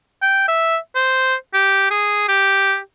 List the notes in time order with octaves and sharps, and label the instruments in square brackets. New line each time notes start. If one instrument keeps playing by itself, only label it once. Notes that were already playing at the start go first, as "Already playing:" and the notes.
[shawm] G5
E5
C5
G4
G#4
G4